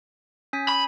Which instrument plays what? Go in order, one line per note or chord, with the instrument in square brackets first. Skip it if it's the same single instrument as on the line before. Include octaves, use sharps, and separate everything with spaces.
[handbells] C#4 G#5 B6
[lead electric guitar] B5